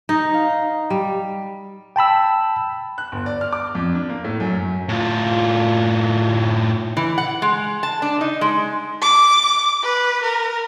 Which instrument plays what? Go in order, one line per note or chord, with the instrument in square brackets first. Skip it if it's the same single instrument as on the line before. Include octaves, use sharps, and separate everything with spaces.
[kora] D#4
F5
G3
[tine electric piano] G5 A5 B5 E6
[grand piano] F#6
G1
D5
F6
D6
F2
D4
A#3
A2
F#2
F#2
[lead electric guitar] A2 F4
[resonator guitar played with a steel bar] E3
F#5
G#3
A5
D4
D#4
G#3
[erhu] D6
B4
A#4